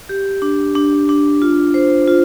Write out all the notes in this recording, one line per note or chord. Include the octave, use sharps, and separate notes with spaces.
G4
D4
D4
D4
F4
C5
F4